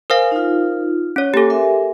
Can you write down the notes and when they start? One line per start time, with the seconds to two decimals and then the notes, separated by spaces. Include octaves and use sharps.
0.10 A#4 C5 F5 G#5
0.32 D#4 F4
1.16 C#4 C#5
1.34 A#3 G4 A4 G#5 D6
1.50 A#4 E5 G#5